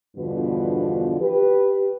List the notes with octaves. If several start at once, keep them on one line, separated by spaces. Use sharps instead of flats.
E2 G2 B2 D3 F3 B4
G4 B4